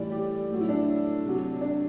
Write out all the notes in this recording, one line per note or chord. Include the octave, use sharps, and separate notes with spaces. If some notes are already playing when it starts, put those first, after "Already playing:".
Already playing: A2 E3 G3 D5
G4
A2 F#3
E4
D4
C3 F#3
D4